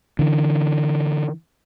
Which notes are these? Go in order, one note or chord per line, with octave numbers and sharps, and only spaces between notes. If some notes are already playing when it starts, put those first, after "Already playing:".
D3 E3